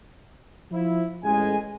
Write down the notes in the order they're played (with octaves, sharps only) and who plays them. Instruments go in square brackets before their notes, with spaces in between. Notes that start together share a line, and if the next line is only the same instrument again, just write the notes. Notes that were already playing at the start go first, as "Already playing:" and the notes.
[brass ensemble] F3 E4
A1 G#3 G#5